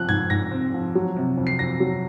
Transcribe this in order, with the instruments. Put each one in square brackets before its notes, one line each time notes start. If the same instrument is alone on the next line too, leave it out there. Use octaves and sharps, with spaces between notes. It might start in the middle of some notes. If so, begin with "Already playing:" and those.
Already playing: [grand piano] F3 C4 F#6
G#2 G#6
G#2 A#6
C4
F3
F#3
C3
F2
C7
F2 A#6
F#3